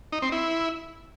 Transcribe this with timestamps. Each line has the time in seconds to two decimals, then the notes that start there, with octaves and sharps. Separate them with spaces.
0.12 D#4
0.22 C4
0.32 E4